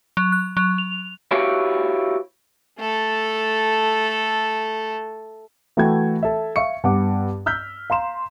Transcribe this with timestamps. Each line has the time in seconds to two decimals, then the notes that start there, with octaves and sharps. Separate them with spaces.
0.17 F#3
0.32 F#6
0.57 F#3
0.78 F7
1.31 E4 F#4 G4 B4 C#5 F5
2.79 A3 A4
5.77 E3 A3 F#4 A4 G5 G#6
6.23 A4 E5
6.56 E5 F5 C#6 C#7
6.84 G2 B3 F#5 D6
7.46 E6 F6 G6 B6
7.90 F5 A#5 C6 E7